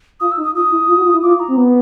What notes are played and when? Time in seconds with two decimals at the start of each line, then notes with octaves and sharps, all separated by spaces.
0.20 F4 D#6
0.32 E6
0.37 D#4
0.43 D#6
0.55 F4 D#6
0.71 E4
0.88 F4
0.97 F#4
1.05 F4
1.14 E4
1.22 F4 D6
1.40 A#5
1.48 C4
1.57 B3